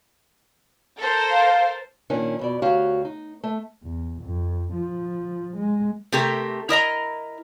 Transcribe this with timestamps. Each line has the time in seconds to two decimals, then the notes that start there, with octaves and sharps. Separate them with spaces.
0.98 A4 A#4 C5
1.31 F5
2.10 A#2 D#3 C#4 D4
2.39 F2 B2 D5
2.62 D2 F#4 G4 C#5 F5
3.05 D#4
3.43 A3
3.83 E2
4.22 F2
4.74 F3
5.57 G#3
6.12 C3 A3 G4 A#4
6.69 E4 A#4 D#5 A#5